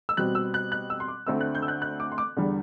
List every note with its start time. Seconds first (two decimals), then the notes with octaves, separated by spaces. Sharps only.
0.09 E6
0.17 B2 G3 C4 F#6
0.35 E6
0.54 F#6
0.72 F#6
0.90 E6
1.00 C6
1.08 D6
1.27 D2 D3 A3 C4 E6
1.41 F#6
1.55 G6
1.62 E6
1.68 F#6
1.82 F#6
2.00 D6
2.12 C6
2.18 D6
2.37 E2 D3 G3